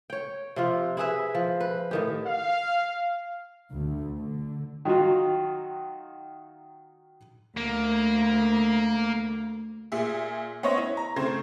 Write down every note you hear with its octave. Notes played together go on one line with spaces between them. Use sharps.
C#5 G5
C3 F3 F4
E4 G#4 B4 E5
F3
B4
A2 D#3 G4
F5
D2
D3
D#3 F#3 D#4 F4 F#4
D2 A#3
A#2 G#4 E5
B3 C#4 C5 C#5 D#5
E4
A#5
C#3 A3 C4 C5 G#6